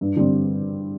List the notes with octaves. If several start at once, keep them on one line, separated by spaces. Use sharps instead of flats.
G2
D3 G3 C4